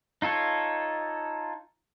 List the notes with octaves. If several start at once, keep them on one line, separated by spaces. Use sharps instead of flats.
D#4 F4 A4 C#5